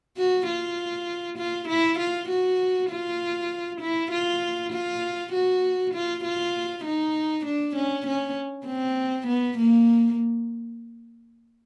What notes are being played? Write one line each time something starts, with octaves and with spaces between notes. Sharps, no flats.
F#4
F4
F4
E4
F4
F#4
F4
E4
F4
F4
F#4
F4
F4
D#4
D4
C#4
C#4
C4
B3
A#3